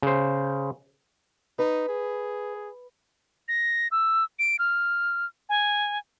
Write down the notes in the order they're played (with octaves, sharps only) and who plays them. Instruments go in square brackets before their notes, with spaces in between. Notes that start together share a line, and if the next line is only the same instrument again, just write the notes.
[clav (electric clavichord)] C#3 C5
[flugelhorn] D#4 [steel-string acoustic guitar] B4
[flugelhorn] G#4
[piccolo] A#6
E6
D7
F6
G#5